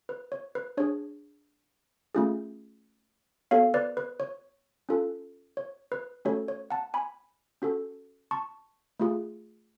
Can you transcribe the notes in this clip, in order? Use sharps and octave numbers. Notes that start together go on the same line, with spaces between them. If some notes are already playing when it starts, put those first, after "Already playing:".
B4
C#5
B4
D4 G#4 C#5
A3 C#4 F4 G#4
B3 F#4 A4 C#5 F5
B4 D5
B4
C#5
C#4 F4 A4
C#5
B4
A3 C#4 F#4 A4 C#5
C#5
F#5 A5
G#5 B5
C#4 F#4 A4
A5 C#6
A3 F4 G#4